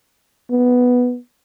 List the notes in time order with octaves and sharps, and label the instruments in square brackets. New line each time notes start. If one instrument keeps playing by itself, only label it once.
[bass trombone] B3